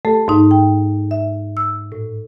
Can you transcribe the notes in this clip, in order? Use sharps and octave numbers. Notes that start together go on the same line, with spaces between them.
A3 G4 A4
G#2 D#4
G5
E5
E6
A2